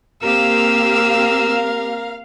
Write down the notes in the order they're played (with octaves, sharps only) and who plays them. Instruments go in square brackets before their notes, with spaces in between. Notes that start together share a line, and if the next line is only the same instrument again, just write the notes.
[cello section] A#3 C4 G4 [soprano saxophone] A#4 [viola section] F5 [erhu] E6